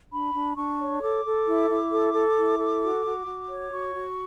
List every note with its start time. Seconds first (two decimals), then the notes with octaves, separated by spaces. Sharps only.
0.12 D4 B5
0.34 D4
0.56 D4 C#6
0.79 C#5
1.01 A4 D6
1.25 A4
1.46 E4
1.69 E4
1.91 A4
2.14 A4
2.36 E4
2.60 A4
2.82 F#4
3.05 F#4
3.26 F#4
3.49 C#5
3.71 F#4 C#6
3.95 F#4